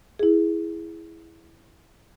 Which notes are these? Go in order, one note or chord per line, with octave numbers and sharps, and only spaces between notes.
E4 G#4